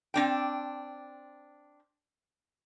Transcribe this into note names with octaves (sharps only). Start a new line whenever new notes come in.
C4 D4 G5